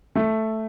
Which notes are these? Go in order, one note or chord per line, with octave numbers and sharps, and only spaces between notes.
A3